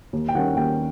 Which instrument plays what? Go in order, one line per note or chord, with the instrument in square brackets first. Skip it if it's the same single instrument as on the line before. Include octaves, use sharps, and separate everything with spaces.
[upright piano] D#2
G5
D#3 G3 A#3 C#4 F#5
D#2 G5